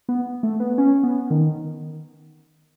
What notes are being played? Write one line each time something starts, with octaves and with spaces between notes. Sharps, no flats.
B3
A3
B3
C#4
B3
D#3